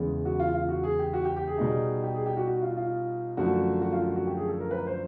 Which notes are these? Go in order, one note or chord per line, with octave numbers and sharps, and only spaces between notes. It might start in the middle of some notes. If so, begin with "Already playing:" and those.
Already playing: E2 C#3 E3 G#3 B3
F#4
F4
F4
F#4
G#4
G4
F#4
G4
G4
G#4
B2 G3 B3 D#4
G4
G#4
G4
F#4
F#4
F4
F4
F#2 D3 F3 A3 F#4
F#4
F4
F#4
F#4
G4
G#4
A4
A#4
B4
C5